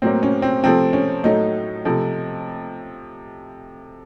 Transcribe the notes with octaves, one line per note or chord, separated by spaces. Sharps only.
A2 F#3 A#3 C4
C#4
C4
C3 F3 A3 C4
C#4
A2 F#3 A3 D#4
C3 F3 A3